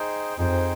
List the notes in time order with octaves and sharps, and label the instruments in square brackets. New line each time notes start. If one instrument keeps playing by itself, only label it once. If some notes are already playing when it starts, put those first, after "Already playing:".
Already playing: [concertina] D#4 G#4 C5 G5
[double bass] F2 [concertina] D#4 G#4 C5 G5